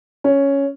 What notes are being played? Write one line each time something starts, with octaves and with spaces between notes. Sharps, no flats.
C#4